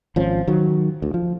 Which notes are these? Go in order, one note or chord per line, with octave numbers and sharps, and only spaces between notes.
G#1 F3 C#4
D#3 F#3
D2
F3